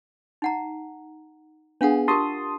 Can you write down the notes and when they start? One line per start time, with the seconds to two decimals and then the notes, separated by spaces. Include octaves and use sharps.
0.42 D#4 F#5 A#5
1.81 B3 D4 G#4 F5 F#5
2.08 F4 G4 A#4 A5 C6 D#6